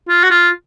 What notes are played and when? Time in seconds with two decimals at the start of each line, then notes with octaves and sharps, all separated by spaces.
0.09 F4
0.23 F#4
0.30 F4